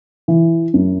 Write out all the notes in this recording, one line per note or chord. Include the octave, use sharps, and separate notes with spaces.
E3
F#2